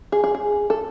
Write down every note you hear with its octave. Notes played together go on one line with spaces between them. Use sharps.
G#4
G#4
G#4
A4